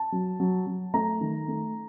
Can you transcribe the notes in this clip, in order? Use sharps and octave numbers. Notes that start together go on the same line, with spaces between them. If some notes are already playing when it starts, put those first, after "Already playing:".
Already playing: A5
F#3
F#3
F#3
A3 A#5
D#3
A3